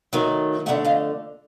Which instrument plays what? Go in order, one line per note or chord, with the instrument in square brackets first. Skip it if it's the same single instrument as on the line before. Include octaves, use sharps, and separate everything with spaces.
[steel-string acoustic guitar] D#3 F#3 A3
F2 D3 F#3 A3 E5 F#5
D#5 F5